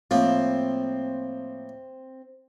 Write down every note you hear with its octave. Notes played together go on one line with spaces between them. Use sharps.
A2 F3 A#3 C4